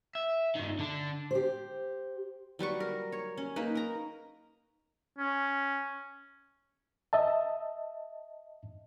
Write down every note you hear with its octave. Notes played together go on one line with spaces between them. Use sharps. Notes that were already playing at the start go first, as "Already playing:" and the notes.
E5
G2 D#3
D3 D4
G4 C5
F#3 G3 B4 C#6
A#4
C#5
C#4
A#3 D#4 B4
A#4 A#5
C#4
D#5 E5 A5